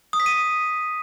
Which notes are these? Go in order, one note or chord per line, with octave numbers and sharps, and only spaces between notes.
D#6
B6
D#7